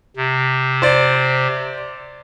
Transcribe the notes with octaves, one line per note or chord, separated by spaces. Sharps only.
C3
C5 D5